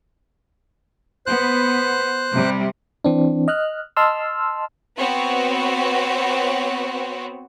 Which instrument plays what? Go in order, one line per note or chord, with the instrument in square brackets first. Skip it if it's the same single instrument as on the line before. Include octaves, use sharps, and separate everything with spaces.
[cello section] B3 [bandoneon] C5 F#6
[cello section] C3 G3
[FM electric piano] E3 C4 D4
D#5 F6 F#6
D#5 A5 C6 E6 F6
[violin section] B3 C4 F#4 B4 C#5